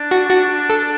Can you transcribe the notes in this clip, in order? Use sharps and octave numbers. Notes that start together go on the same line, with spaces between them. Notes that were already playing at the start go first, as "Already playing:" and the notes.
Already playing: D4
F#4
F#4
A4